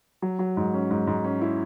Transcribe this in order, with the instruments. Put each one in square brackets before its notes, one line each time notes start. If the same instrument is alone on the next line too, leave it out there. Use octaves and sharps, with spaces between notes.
[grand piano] F#3
F#3
G#2
C#4
G#2
G#2
C#4
E4